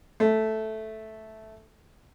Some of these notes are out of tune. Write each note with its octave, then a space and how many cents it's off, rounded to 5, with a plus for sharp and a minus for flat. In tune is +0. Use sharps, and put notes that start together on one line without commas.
A3 -5